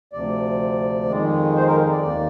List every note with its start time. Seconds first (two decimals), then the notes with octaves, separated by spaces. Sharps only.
0.12 D2 C3 F3 D5
1.08 F2 D#3 G#3
1.56 C5
1.68 A#4
1.91 D5
2.03 D#2 D#3 A#3